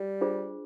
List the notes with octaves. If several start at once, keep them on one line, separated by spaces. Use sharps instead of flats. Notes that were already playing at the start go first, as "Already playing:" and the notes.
Already playing: G3
D4 F4 G#4 C5